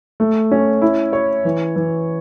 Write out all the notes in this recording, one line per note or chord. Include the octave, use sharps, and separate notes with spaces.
A3
C#4
E4
C#5
E3
E3